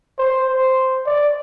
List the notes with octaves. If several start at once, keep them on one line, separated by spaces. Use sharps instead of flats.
C5
C5
D5